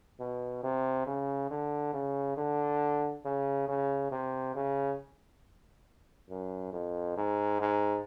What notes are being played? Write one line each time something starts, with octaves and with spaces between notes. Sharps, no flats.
B2
C3
C#3
D3
C#3
D3
C#3
C#3
C3
C#3
F#2
F2
G#2
G#2